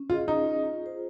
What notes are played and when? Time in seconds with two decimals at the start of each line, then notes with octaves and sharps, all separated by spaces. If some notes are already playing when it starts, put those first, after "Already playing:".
Already playing: C#4
0.10 F4 G#4 D#5
0.28 C#4 D#4
0.46 G#4 D#5
0.65 F4
0.82 G#4 C5